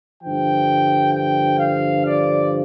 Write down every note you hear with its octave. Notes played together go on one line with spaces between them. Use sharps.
G2 D3 F3 G5
G5
F5
D5